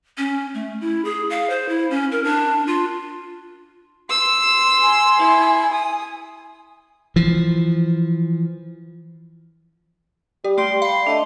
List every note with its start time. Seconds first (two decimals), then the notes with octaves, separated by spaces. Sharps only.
0.18 C#4
0.54 A3
0.81 E4
1.05 G#4
1.30 F5
1.50 C5
1.69 E4
1.90 C#4
2.12 A#4
2.24 D4
2.67 F4
4.10 C6 E6
4.81 G#5
5.20 E4
5.73 D#6
7.16 E3 F3
10.44 G3 G4
10.58 A3 G4 D5 G5 C6
10.82 F5 B5 C6 C7
11.07 A3 D4 D#5